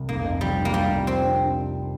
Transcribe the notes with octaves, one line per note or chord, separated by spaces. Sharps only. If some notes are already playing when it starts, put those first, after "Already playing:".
Already playing: C2
F1 A#3
F2
F3 G3
D4
A#3
F1 G3
F2
F3 C4
D4